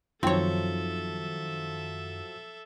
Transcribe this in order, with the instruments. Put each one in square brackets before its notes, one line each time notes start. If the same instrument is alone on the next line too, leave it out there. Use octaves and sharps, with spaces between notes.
[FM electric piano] F#2 D#3 [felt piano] F3 F#3 [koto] C4 C#5 [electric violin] A4 E5